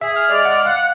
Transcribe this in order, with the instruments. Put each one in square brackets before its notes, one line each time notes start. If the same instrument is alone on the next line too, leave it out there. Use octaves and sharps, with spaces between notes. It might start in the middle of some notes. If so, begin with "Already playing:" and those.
[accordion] G#4 [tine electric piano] E5
[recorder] F6
[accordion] G#3 D5
[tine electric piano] F#5
[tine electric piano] F5 [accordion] F#5 [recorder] F#6